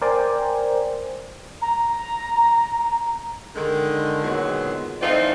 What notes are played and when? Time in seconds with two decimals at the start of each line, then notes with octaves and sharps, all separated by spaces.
0.02 A#4 C5 D5 G5 G#5
1.62 A#5
3.55 D3 D#3 G#3
4.24 A#2 D3 D#3 F#3 G#3 B3
5.01 E3 A3 C4 D#4 F4 D5